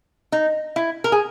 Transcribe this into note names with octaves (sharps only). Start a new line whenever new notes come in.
D#4
E4
A#4
G#4